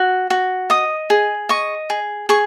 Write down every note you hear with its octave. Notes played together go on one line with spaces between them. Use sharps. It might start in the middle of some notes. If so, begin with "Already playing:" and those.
Already playing: F#4
F#4
D#5 D#6
G#4
D#5 C#6
G#4
G#4 C#6